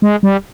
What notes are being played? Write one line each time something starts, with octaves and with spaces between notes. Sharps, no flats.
G#3
G3